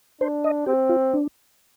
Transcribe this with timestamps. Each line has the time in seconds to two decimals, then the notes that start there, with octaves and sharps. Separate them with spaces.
0.21 D4 C5
0.44 D#5
0.66 C4 G4
0.89 F4
1.13 D4